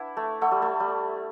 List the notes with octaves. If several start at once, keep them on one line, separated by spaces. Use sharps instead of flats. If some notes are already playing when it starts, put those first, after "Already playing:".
Already playing: D4 E4 B4 F#5 A5
A3
A3 F#5 C6 E6
G3
A3
G3